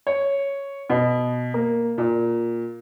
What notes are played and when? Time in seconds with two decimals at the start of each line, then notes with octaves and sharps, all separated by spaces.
0.07 C#5
0.90 B2
1.54 A#3
1.98 A#2